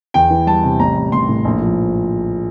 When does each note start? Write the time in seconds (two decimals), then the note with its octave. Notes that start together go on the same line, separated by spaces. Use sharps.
0.14 E2 G5
0.30 E3
0.47 G3 A5
0.64 C3
0.79 A1 A#5
0.97 G3
1.12 A1 C6
1.29 A2
1.45 A#1
1.61 F3